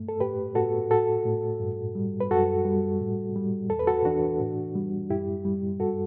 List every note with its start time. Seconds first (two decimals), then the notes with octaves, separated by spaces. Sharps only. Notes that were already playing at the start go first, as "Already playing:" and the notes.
Already playing: G2 A3
0.09 A4
0.20 A2 G4 B4
0.55 A2 F#4 A4
0.90 A2 F#4 A4
1.25 A2
1.60 G2
1.95 G3
2.20 B4
2.31 F#2 F#4 A4
2.65 G3
3.01 A2
3.36 G3
3.70 E2 A4
3.79 B4
3.87 F#4 A4
4.05 E3 D4 F#4
4.40 A2
4.75 G3
5.10 F#2 E4 G4
5.45 G3
5.80 G2 F#4 A4